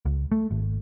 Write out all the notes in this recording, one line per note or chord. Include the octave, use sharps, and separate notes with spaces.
C#2
A3
G#1